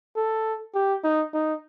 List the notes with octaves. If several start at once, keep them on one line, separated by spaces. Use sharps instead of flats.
A4
G4
D#4
D#4